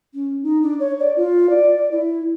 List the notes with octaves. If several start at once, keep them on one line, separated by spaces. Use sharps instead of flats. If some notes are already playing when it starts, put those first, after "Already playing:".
C#4
D#4
D4
C#5
D5
F4
D5
E4